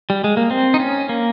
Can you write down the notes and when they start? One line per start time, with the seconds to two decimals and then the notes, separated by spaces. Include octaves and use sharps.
0.10 G3
0.24 G#3
0.37 A#3
0.51 C4
0.74 D#4
0.80 C#4
1.09 A#3